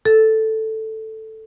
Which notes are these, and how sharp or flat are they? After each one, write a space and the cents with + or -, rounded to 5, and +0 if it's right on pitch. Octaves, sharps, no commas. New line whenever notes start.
A4 +0